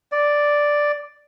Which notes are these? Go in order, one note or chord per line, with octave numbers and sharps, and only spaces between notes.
D5